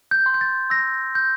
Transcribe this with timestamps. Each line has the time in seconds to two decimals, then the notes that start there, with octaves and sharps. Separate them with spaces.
0.11 G6
0.26 C6
0.34 G6
0.41 A6
0.70 E6 A#6
1.15 G6